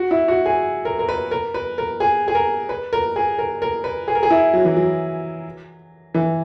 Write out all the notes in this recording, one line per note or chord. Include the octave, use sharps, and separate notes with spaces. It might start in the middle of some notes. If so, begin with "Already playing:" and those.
Already playing: F#4
E4
F#4
G#4
A#4
A#4
B4
A#4
B4
A#4
G#4
G#4
A#4
B4
A#4
G#4
A#4
A#4
B4
G#4
A#4
G#4
E4
F#3
E3
F#3
E3